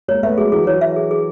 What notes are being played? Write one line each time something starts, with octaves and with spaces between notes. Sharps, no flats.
G#3 A#3 C#5
A3 B3 E5
F#3 G#3 G#4
E3 F#3 G#4
E3 F#3 C#5
E5
G#4
G#4